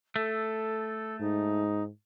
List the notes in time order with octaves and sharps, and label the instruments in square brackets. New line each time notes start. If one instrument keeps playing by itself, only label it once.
[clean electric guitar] A3 [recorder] A4
[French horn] G#2 [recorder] D#4